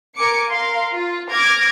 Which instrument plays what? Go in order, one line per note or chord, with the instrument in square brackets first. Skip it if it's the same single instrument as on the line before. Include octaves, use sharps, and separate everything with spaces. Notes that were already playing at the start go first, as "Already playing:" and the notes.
[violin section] A#4 G#5 D6 C#7
A#4 F5 C6
F4
D6 F6 G#6 A#6 D7